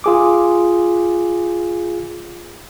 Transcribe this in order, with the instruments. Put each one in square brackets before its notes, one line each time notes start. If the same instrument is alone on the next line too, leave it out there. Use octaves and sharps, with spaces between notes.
[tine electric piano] F4 G#4 D6